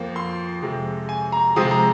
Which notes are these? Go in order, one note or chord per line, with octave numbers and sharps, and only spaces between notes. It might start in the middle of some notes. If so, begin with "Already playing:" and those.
Already playing: F2 F3 A#3
C6
F2 C3 G#3
G#5
A#5
C3 F3 G#3 C4 D#6
A#5